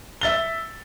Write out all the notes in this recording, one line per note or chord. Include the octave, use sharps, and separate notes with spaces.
E5 A6 G7